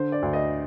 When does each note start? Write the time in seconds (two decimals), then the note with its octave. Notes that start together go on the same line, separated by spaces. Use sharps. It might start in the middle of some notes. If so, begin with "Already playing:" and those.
Already playing: D3 C5
0.12 D5
0.22 D2
0.33 D#5